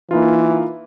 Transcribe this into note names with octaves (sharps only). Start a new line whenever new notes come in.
E3 A#3 D#4 F4